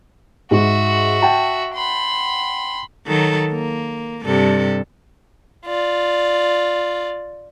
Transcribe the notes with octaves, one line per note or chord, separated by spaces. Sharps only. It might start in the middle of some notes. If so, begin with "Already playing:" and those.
G#2 F#4 E5
F#5 G5 A5
B5 C6
D#3 F#3 A4
A#3
G2 C3 A4
F4 D5